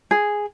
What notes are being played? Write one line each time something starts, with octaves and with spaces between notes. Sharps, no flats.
G#4